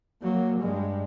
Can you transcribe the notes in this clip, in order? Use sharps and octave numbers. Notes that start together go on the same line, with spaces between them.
F#3 A#3
G2 G#3